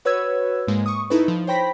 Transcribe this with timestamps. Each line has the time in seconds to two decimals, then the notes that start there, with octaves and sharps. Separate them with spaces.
0.05 F#4 B4 C#5 E6 G#6
0.67 G#2 G#3 A#3
0.86 C#6 D#6
1.10 D#4 E4 A4 B4
1.28 F3
1.47 C5 C#5 G5 B5 A#6 B6